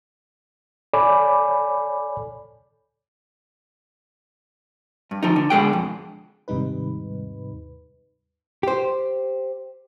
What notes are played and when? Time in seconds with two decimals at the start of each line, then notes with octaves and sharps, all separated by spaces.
0.93 A4 C#5 D5 G#5 B5 D6
5.11 G2
5.23 D2 F3 D#4
5.36 D3
5.50 B2 D3 G#3 G#4 F#5 G5
5.73 F2
6.48 D#2 G#2 C3 G3 D#4 B4
8.63 G4 C5